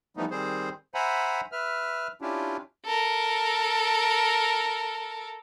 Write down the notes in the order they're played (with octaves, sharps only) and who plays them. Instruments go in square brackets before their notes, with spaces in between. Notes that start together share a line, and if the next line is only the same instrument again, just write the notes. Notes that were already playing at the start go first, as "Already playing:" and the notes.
[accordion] E3 F3 G3 A3 B3 D#4
D#3 G3 C4 G#4 C5
C5 E5 F#5 G#5 A#5 B5
B4 E5 F6
C#4 D4 E4 F4 G4
[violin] A4 A#4